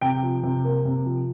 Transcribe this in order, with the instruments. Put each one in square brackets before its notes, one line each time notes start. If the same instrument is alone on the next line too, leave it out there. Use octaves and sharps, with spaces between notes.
[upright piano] C3 G5
F3
C3
A#3
C3
F3